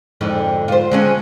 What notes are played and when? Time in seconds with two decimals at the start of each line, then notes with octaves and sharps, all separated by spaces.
0.21 F2 G#2 D3
0.68 F4 C5
0.91 D3 G#3 C#4